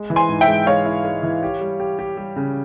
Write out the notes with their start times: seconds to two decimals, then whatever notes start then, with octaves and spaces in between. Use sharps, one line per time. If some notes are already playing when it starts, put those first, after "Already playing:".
Already playing: G#3
0.10 E3
0.16 G#5 C6
0.29 G#2
0.41 E5 G5
0.48 G#3
0.67 G#3 C#5 F5
0.85 E4
1.04 G#3
1.23 E3
1.43 G4
1.61 G3
1.80 G4
1.99 G4
2.17 G3
2.36 C#3